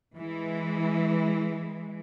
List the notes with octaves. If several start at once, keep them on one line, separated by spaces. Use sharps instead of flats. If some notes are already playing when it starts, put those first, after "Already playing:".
E3 G#3